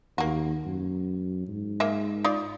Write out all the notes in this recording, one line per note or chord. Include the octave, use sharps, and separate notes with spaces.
D#2 A#3 F#4
F#2
G#2
G#3 A#3 E5
D#4 F4 D5